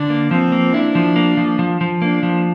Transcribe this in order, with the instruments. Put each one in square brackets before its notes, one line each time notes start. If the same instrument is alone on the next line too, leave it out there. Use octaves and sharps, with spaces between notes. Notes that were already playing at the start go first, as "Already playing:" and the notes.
Already playing: [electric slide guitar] D3 [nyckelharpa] D4
[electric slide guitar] A#3
[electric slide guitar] F3 [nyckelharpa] C4
[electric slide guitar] A#3
[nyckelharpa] D4 [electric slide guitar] E4
[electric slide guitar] F3
A#3
F3
F3
F3
[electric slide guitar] A#3 [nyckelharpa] D4
[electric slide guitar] F3